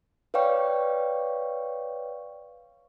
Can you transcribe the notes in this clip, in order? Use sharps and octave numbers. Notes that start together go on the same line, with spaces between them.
B4 C#5 D5 F5 G5 C#6